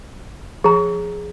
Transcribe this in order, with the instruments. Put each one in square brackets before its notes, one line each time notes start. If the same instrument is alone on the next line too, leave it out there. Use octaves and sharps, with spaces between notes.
[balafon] F3 [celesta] G#4 A#5